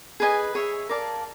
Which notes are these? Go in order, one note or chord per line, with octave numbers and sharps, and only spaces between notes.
G#4 B4 D#5 G#5
G#4 C#5 E5
A#4 D5 F5 A5